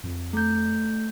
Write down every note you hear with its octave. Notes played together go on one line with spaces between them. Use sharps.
F2
A3 G6